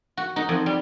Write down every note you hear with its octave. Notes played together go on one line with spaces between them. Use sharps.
F#4
D#4
F2
G3